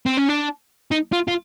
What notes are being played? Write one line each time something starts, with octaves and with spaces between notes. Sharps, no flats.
C4
C#4
D4
D#4
F4
F4